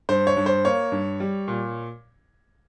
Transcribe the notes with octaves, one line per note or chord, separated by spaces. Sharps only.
G2 C5
C#5
G2
C5
A#3 C#5
G2
G3
A#2